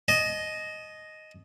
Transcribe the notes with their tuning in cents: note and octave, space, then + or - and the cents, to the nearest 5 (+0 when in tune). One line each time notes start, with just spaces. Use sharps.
D#5 +0 A5 -40